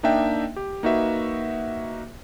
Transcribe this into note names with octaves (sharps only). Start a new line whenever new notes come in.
A#3 D4 D#4 D#5 E5 G5
G4
A#3 D#4 F#4 B4 E5